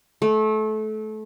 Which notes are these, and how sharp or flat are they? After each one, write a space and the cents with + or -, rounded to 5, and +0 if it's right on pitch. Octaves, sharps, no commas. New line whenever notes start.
A3 -25